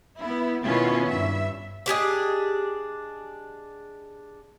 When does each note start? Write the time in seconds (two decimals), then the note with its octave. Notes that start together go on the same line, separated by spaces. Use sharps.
0.21 B3 E4
0.63 B2 D#3 B3 C#4 E4 F4
1.07 G2 E5
1.86 D4 G4 G#4 D#5